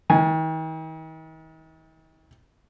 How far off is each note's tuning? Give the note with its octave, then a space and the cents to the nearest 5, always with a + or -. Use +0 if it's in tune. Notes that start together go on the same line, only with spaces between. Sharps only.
D#3 +45 G#5 +0